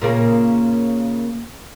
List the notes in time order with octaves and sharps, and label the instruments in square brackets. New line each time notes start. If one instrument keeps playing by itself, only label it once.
[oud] A#2 C#3 A#3